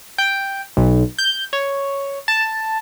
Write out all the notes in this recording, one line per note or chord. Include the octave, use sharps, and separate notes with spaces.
G5
B1
G6
C#5
A5